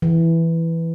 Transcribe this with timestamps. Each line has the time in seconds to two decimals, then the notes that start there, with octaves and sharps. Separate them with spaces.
0.02 E3